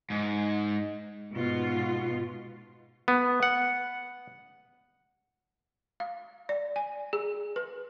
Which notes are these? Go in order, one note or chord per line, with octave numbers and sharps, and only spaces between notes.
G#2
G#2 B2 F4
B3
F#5
F5
D5
G#5
G#4
B4